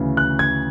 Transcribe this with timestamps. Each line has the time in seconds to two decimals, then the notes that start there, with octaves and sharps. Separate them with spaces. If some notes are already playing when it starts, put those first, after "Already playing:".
Already playing: D2 C#3 E3
0.17 F#6
0.39 G#6